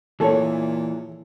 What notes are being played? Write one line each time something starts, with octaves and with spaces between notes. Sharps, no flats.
A#2 E3 G#4 A4 C#5